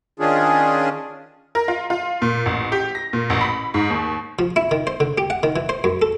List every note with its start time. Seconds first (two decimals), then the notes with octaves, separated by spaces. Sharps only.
0.20 D#3 C#4 D4 F4 G#4
1.55 A#4
1.68 F4
1.90 F4
2.22 A#2
2.46 A1
2.72 G4
2.95 A#6
3.13 A#2
3.30 A1
3.41 B5
3.74 G#2
3.90 D#2
4.39 F3
4.56 E4
4.71 D#3
4.87 C5
5.00 D3
5.18 G4
5.30 F#5
5.43 D#3
5.56 E3
5.69 C5
5.84 F#2
6.02 A4